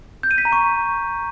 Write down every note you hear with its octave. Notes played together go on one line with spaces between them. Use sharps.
G6
D#7
B6
A#5
C#6